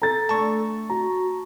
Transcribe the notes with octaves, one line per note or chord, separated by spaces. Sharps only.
A4 A#5 A6
A3 C4 D4 A5 C#6
F#4 A#5